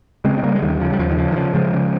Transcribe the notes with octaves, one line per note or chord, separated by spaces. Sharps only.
C#3 G#3 C4
C4
C#3 G3 A#3
G#3
D#2 D#3 G3
C#3 F3
G3
D#2 F3
D#3
C#3 F3
D#3
C#3 F3
C#3 F3 G#3
C#3